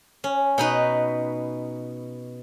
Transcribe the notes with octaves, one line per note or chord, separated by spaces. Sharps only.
C#4
B2 D#4 B4